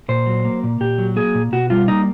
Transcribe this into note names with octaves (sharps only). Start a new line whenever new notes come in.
A#2 C5
F#3
A#3
A#2
A#2 G4
F#3
A#3 G#4
A#2
B2 F#4
G3 F4
A#3 D#4